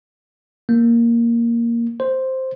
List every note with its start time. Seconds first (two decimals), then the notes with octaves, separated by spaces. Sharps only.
0.69 A#3
2.00 C5